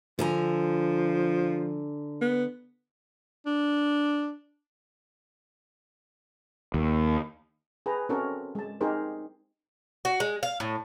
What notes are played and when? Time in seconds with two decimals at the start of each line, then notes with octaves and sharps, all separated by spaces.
0.19 D3 F3 G#5 A#5
2.21 B3
3.46 D4
6.74 D#2
7.86 G#4 B4 G5 A#5
8.09 C4 C#4 F#4 A4 A#4
8.55 G#3 A5
8.81 C4 D#4 G4 G#4 A#4 C5
10.05 F#4
10.20 G#3
10.43 F5
10.60 A2